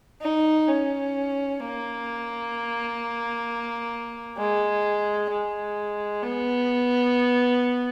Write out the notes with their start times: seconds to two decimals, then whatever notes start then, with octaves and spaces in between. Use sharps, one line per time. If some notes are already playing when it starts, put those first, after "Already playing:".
0.22 D#4
0.68 C#4
1.60 A#3
4.38 G#3
5.30 G#3
6.23 B3